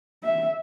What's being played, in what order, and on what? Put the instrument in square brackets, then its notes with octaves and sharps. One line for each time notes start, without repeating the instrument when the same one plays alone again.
[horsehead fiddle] E5